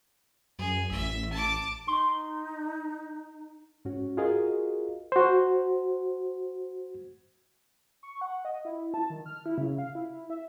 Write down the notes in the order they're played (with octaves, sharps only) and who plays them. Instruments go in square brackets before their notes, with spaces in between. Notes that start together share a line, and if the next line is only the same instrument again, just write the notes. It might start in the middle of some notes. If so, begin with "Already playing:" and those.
[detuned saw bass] F#2 [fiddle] G#4
[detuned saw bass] A1 [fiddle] E5
[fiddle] A5 D6
[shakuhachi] D#4 [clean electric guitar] C6
[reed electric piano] G#2 C#4 F#4
F4 F#4 G#4 A#4 D#5 F5
F#4 C5
[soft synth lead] C#6
F#5
D#5
E4
A5
D#3
F6
E4
C#3
F5
E4
E5